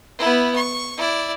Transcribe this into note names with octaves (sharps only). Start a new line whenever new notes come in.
B3 E4
C#6
E4 D5